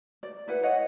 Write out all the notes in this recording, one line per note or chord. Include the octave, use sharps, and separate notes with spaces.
D5
E4 B4 F#5
C#5 D#5 F#5